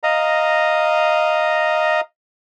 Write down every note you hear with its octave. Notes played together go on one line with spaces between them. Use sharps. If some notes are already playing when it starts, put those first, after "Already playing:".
D#5 F5 A#5